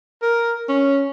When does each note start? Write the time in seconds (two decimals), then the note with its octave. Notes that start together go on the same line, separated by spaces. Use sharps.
0.22 A#4
0.68 C#4